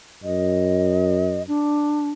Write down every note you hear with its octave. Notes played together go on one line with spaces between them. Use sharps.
F#2 D#5
D4